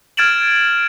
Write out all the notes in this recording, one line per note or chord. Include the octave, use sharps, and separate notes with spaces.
F6 G#6 A6 D7 E7 F#7